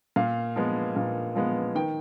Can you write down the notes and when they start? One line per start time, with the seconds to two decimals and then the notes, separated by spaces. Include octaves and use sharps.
0.16 A#2 F5
0.56 F3 G#3 B3
0.96 A#2
1.35 F3 G#3 B3
1.75 D#3 G5